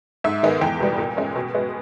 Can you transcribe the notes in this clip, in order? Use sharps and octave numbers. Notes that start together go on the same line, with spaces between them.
G#2 E5
D#3 G#3 B3
E2 G5
B2 G3 B3
A#2
G#3 C#4
B2
G#3 B3